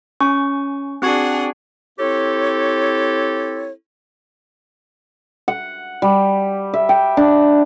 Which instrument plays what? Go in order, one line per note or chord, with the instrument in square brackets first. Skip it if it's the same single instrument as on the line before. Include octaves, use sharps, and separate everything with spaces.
[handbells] C#4 G#5 C#6
[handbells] C4 F#4 G#6 [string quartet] D4 G#4 F#5
[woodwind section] C4 E4 G4 A4 C#5
[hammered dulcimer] F#5
G3
E5
G5
D4